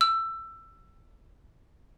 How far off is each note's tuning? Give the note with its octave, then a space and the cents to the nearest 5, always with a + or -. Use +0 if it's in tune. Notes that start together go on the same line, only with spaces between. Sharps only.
E6 +15